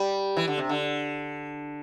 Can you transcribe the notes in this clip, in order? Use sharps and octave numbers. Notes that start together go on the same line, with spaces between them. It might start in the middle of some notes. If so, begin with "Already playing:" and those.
Already playing: G3
E3
D3
C3
D3